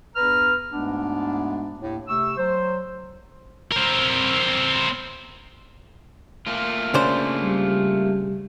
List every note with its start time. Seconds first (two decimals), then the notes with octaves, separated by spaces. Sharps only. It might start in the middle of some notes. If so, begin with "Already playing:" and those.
0.16 E2 G2 B4 A#5 F6
0.72 D2 G#2 G#3 B3 D4
1.80 D#2 A2
2.08 C3 A3 C#6 E6
2.38 F#3 C5
3.72 C4 A#4
6.46 A3 A#3 F4
6.94 C#3 D4 C5
7.43 G3